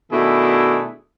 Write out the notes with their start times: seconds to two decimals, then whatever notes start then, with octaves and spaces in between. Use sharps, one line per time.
0.12 B2 D#3 A3 D4 E4 G#4